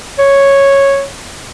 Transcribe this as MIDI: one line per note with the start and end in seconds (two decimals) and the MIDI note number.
0.18 1.04 73